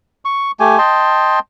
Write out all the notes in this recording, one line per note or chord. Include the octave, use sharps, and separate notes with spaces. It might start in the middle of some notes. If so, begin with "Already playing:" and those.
C#6
A3 G4 G#5
D#5 G5 A5 C6